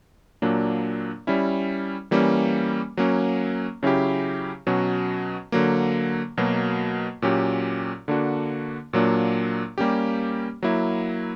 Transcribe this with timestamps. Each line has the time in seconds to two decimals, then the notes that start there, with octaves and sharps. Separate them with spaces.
0.42 A#2 F#3 A#3 D4
1.27 G3 C#4 E4
2.11 E3 G3 A#3 C#4
2.97 F#3 A#3 C#4
3.83 C#3 F#3 C#4 E4 G4
4.67 B2 F#3 C#4 F#4
5.52 D3 F#3 A#3
6.38 B2 F#3 A#3
7.22 A#2 F#3 C#4 G4
8.08 D3 A#3 D4 F#4
8.93 A#2 F#3 A#3 D4
9.78 G3 A#3 C#4 G4
10.63 F#3 A#3 E4